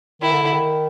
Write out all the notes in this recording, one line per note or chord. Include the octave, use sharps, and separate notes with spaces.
D#3 E4
D3
D3
D#3